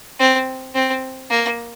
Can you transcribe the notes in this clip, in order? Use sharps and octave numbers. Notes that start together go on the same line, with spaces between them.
C4
C4
A#3